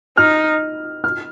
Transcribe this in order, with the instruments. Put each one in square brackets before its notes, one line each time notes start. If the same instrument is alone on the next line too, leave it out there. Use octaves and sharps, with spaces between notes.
[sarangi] D#4 [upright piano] F6
[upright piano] F6